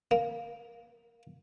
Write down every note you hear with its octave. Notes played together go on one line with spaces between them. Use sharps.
A#3